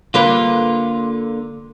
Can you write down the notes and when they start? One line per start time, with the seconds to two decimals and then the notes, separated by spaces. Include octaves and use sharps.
0.14 D3 A#3 F4 B4